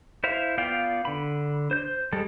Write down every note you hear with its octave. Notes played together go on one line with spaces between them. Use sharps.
E4 C5 E5 F5
B3 F4 D5 F5 G5
D3 B5
C5 G6
G3 G#3 A4